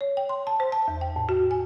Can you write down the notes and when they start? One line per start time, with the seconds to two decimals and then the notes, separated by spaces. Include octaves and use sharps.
0.01 C#5
0.17 G5
0.29 C6
0.47 A5
0.60 C5
0.72 A5
0.88 E2
1.01 G5
1.16 A2
1.29 F#4
1.51 G#5